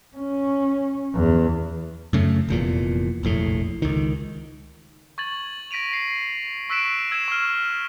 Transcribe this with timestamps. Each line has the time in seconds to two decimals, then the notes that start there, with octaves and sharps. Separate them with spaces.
0.17 C#4
1.15 E2
2.13 F#2 C#3 A3
2.48 F1 E2 A#2
3.23 F1 A#1 A2
3.82 C#2 D#3
5.18 C#6 G#6 A6 F#7
5.71 A#6 B6 D7 D#7 F7
5.93 C7
6.70 C#6 E6 F#6 B6 D7 E7
7.11 E6 G#6 C7 D7 E7
7.28 C#6 F6